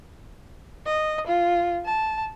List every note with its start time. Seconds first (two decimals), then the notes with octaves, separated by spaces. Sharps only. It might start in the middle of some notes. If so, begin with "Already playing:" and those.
0.86 D#5
1.27 F4
1.86 A5